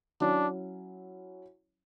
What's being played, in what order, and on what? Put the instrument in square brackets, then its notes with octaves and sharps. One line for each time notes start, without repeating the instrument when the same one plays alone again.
[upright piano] F#3 C#4 E4 [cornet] D4